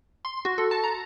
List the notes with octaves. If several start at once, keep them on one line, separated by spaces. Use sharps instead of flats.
C6
F#4
A4
A5
A#5